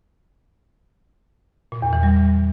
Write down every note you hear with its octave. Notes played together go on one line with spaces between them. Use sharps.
A#2
E2
E3
G3